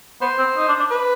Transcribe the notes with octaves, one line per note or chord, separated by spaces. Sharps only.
B3 C5
C4
D#4
D4
D4
B4